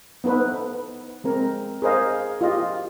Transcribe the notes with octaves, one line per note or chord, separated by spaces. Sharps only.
B3 D#4 A4 B4 C5
G#3 C4 A#4
G#4 A#4 C5 D#5 F5
F4 G4 D#5